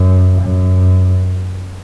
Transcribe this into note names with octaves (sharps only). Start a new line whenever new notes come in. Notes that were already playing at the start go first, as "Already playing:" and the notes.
Already playing: F#2
F#2